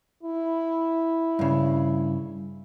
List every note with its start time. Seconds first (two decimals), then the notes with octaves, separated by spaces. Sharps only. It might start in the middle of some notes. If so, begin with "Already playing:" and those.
0.23 E4
1.39 G2 C#3